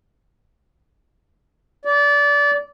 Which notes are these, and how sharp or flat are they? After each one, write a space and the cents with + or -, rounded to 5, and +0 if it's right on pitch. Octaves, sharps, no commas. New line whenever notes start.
D5 -25